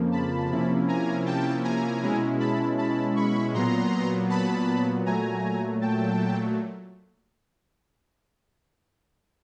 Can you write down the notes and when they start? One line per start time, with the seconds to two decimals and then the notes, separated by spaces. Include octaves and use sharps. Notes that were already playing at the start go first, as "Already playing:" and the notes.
Already playing: F2 C#3 F3 A#3
0.12 A5 B5
0.50 C3 F3 A#3 C#4 E4
0.88 G#5 A#5
1.26 G5 A5
1.64 G#5 A#5
2.02 B2 G#3 C#4 E4
2.40 A5 B5
2.78 A5 B5
3.16 B5 C#6
3.54 A#2 F#3 B3 A#5 C6
4.30 A5 B5
5.06 A#2 F#3 A3 G#5 A#5
5.81 G5 A5